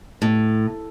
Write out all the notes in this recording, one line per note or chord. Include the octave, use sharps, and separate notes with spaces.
A2